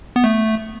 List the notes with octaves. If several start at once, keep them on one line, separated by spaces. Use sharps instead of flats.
B3
A3